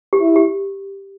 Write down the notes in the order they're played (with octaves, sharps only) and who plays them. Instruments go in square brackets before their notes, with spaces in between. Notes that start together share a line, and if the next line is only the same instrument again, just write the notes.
[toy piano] G4
[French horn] E4
[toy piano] G4